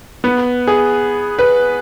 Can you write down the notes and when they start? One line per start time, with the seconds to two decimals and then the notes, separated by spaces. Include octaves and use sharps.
0.24 B3
0.67 G#4
1.39 B4